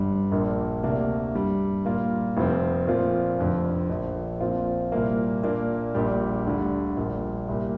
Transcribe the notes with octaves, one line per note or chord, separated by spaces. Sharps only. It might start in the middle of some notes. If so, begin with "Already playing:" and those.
Already playing: G1 G2 G3
A#1 A#2 A#3 D4
D2 C3 A#3 D4
G2 G3 D4
A#2 G3 A#3 F4
F1 F2 F3 C4
A#2 F3 C4 F4
F1 F2 D3 F3
A#1 A#2 F3
A#1 A#2 F3 C4 F4
C2 A#2 A#3
A#2 A#3 D4
A#1 A#2 G3 D4 G4
D2 D3 G3
A#1 A#2 G3
C2 A#2 A#3 G4